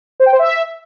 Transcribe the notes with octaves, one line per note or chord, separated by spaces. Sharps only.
C5
G5
C5
E5